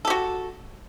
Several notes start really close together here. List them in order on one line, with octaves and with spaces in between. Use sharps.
A4 G4 F#4